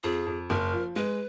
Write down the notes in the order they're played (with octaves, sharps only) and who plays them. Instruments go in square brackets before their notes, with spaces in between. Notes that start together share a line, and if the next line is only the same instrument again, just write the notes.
[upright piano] F2 [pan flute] G#4
[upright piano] F2
[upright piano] F#1 [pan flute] A#4
[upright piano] F3
[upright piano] G#3 [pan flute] B4